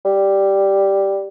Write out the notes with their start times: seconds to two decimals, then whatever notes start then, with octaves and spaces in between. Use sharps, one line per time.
0.05 G3